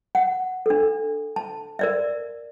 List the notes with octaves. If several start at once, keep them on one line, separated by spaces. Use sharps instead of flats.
F#5
D4 A4
A5
A#4 D5 E5